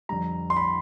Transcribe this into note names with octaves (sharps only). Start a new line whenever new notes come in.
F2 D3 G3 A#5
C6
B5